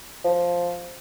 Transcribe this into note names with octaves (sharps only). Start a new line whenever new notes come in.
F3